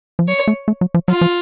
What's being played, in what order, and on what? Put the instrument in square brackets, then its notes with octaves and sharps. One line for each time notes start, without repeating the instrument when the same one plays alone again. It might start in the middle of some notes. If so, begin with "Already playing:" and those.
[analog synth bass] F3
[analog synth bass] F#3 [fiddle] C#5
[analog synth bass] A3
A3
F#3
F3
[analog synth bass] F#3 [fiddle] F4
[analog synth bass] F3